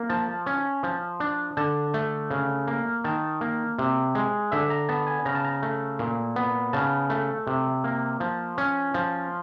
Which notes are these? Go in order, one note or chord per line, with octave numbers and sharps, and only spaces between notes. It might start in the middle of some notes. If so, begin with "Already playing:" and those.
Already playing: A#3
F3 A5
C#4
F3
D4
D3 A5
A3
C#3
A#3
D#3 A5
A#3
C3
G#3
D3 E5
A#5
B3 A5
G#5
C#3 A#5
A5
A#5
A3
A#2
B3
C#3 A5
A3
C3
A#3
F3
C#4
F3